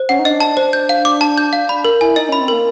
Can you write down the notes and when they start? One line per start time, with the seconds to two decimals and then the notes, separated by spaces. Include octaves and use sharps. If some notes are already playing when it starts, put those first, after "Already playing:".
Already playing: C5
0.09 C#4 F#5
0.19 D#4
0.25 D4 D#5
0.40 A5
0.57 C5
0.73 G6
0.89 F5
1.05 D6
1.21 A5
1.38 G6
1.53 F5
1.69 D4 B5
1.85 A#4
2.01 E4 G#5
2.16 D#4 D#5
2.29 C#4 B5
2.41 C4
2.48 A#3 A#4